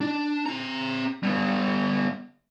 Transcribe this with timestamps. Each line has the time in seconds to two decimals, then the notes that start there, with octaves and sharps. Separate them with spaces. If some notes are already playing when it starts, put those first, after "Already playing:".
0.01 D4
0.46 C4 A#5
1.23 G3 B3